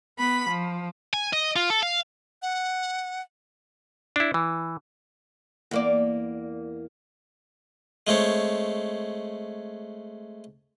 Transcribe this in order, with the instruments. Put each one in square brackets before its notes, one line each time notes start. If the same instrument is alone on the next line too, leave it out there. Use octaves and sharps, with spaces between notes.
[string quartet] B3 B5
F3
[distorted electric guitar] G#5
D#5
F4
A4
F5
[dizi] F#5
[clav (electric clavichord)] D4 E4
E3
[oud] E2 A#3 D5
[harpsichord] G#3 A3 C4 C#5